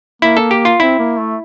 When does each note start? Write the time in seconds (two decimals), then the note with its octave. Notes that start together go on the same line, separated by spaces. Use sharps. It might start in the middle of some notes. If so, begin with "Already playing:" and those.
0.22 A#3 E4
0.37 A4
0.51 G4
0.65 F4
0.80 C4 E4
0.99 A#3
1.18 A3